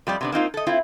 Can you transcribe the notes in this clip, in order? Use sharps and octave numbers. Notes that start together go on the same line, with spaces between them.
F2 G3 G4 D5
C3 B3 D4
A#3 C4 D#4 F4
A4 D#5
C4 E4 F4